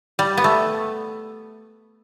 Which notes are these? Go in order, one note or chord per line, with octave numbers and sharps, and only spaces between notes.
G3
B3
A3